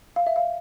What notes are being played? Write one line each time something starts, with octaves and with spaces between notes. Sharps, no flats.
F5
E5
F5